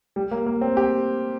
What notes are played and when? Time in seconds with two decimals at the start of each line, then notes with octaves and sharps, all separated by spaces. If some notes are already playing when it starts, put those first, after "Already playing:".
0.16 G3
0.31 A#3
0.46 A#3
0.61 C4
0.77 G4